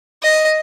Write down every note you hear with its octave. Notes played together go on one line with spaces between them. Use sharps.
D#5